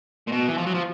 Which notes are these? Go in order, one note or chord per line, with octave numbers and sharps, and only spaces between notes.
A#2
B2
E3
F3
F#3
F3